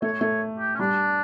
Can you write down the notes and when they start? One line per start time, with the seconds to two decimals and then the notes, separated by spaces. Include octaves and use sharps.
0.02 A3 C#5
0.21 A3 C#5
0.59 G4
0.75 C#4
0.79 G3 D4